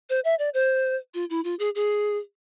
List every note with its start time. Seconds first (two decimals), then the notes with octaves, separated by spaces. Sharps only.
0.10 C5
0.25 E5
0.39 D5
0.54 C5
1.14 F4
1.30 E4
1.44 F4
1.59 G#4
1.75 G#4